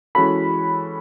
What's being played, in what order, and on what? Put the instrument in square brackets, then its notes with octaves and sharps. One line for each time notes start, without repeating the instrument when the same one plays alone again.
[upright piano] E3 G#3 C#4 F#4 A4 [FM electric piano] B5